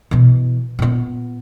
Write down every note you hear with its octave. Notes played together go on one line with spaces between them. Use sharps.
B2 E3
A#2 B3